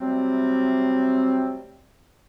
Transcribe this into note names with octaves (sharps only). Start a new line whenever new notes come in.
C3 F#3 G3 A3 C4